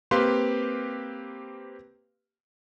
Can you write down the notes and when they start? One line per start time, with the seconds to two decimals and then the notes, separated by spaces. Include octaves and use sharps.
0.11 A#3 C4 G4 B4 F5 C6